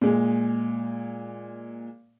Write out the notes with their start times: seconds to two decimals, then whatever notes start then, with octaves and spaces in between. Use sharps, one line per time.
0.01 A#2 G#3